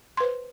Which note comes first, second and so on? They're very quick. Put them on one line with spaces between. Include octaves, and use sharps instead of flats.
C6 B4 C5